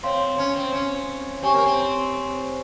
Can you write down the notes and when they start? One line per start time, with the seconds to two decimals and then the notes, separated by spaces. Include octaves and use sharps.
0.03 C4 C#5 F5 C6
0.38 C#4
0.55 C4
0.73 C#4
1.42 C4 G4 C#5 G#5 C#6
1.54 A#3
1.66 C4